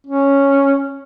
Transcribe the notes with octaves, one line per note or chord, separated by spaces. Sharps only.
C#4